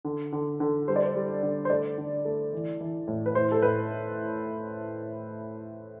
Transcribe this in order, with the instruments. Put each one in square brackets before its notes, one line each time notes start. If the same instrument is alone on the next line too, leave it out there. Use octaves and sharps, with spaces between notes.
[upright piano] D3
D3
D3
G3 C5
D5
C5
G3
D3
C5
A3 D5
D3
A3
E3
E3
A2
B4
A2 C5
A4
A2 B4